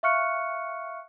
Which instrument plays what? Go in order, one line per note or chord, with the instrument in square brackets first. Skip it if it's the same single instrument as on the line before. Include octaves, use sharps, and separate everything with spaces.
[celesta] E5 F5 C#6 F6 F#6 C#7